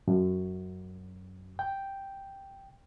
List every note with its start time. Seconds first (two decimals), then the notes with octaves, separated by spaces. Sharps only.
0.08 F#2
1.59 G5